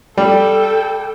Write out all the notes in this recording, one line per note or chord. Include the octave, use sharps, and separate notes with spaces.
G3 A4 G5